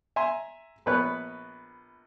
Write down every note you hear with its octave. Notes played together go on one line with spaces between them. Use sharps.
E5 G#5 A#5 C6
A#1 B3 B4 C#5 F#6